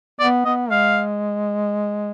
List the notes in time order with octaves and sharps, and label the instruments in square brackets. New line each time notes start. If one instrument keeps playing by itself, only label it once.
[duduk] B3 [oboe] D5
[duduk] B3 [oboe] D#5
[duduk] G#3 [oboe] F5